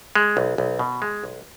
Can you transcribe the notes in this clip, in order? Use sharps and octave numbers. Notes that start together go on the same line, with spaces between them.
G#3
B1
B1
B2
G#3
B1